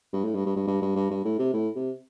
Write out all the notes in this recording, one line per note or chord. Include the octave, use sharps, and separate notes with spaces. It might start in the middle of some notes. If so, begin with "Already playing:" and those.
G2
A2
G2
G2
G2
G2
G2
G2
G2
A2
C3
A2
C3